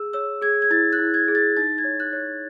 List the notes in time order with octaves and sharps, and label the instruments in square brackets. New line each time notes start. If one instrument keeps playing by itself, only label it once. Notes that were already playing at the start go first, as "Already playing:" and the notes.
Already playing: [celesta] G#4 E6
C#5 E6
G#4 G#6
G#6
E4 A6
F#6
E4
G#6
G#4
A6
D#4 A6
G#6
C#5
F#6
C#5